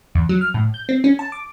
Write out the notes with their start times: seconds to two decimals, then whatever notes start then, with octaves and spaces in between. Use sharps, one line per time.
0.15 E2
0.29 F#3
0.41 F6
0.54 A2
0.74 G6
0.89 C4
1.04 C#4
1.19 A5
1.32 D6